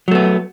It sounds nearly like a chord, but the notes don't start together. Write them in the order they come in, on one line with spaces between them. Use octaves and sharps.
F#3 A3 B3